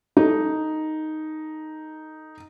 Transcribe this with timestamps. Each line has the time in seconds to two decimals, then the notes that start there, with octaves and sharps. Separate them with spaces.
0.17 D#4 A4